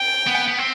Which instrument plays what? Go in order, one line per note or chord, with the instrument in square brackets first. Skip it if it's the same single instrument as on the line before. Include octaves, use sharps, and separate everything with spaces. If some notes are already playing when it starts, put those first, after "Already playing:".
Already playing: [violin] G5
[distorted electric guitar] B3
B3
C4